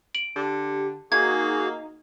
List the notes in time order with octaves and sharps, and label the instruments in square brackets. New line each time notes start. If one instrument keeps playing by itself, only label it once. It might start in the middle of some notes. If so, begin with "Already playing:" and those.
[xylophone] D7 F#7
[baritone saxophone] D3 [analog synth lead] G4
[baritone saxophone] A#3 [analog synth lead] D#4 [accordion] F#4 G#4 [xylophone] G#6